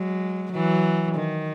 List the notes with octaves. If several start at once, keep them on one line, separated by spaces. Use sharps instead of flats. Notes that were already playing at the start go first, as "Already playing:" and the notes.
Already playing: F#3 G#3
E3 F#3
D#3